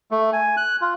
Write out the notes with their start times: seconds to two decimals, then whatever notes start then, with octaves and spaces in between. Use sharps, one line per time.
0.11 A3
0.33 G#5
0.57 F#6
0.81 F4